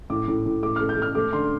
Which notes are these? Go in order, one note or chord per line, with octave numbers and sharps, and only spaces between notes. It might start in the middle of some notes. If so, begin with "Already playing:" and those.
A2 D6
A2
A2
A3 D6
F6
A3
G6
A3 F6
A3 D6
D3 C6